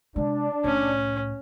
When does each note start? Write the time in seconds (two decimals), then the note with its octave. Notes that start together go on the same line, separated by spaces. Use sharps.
0.16 C3 G#3 D4
0.64 C2 A2 C#4